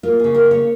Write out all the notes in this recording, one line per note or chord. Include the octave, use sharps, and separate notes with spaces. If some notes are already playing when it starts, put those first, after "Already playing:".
A#3 F4
C#3 G#4
A#4
A#3
C#5